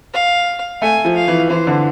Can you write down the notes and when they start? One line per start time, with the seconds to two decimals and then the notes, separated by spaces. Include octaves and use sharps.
0.14 F5
0.82 A3 G#5
1.05 F3
1.16 F5
1.28 E3
1.50 E3 C5
1.67 D3